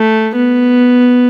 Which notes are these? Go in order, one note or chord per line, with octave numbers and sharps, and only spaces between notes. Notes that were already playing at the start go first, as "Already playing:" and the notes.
Already playing: A3
B3